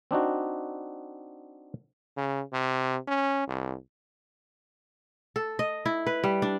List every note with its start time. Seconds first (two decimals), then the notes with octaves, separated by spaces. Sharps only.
0.11 C4 D4 D#4 F#4
2.17 C#3
2.53 C3
3.08 C#4
3.47 C2
5.36 A4
5.59 D#5
5.86 E4
6.07 B4
6.24 G3
6.42 D4